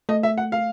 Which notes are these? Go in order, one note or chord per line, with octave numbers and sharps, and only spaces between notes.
A3 D#5
E5
F#5
F5